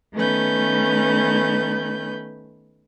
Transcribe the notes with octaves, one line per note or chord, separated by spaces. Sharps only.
D#3 A3 B3 C#4 B4 G6